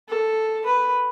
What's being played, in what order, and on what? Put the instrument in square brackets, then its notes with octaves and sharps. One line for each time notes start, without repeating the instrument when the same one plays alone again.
[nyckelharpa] A4
B4